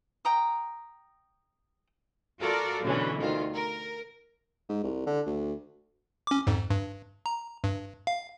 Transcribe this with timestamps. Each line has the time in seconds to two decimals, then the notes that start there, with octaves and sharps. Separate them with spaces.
0.25 G5 A#5 D#6
2.41 F4 F#4 A4 A#4 D5
2.83 F#2 B2 D3 E3 C#4
3.18 D2 D#3 F4
3.53 A#4
4.69 G#2
4.84 C2
5.06 D3
5.26 D2
6.27 C#4 D6
6.47 F2 G#2
6.70 G2
7.26 A#5
7.64 G2
8.07 F5